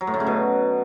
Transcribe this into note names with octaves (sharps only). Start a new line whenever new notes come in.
F#3
A2
D3
C#3
B2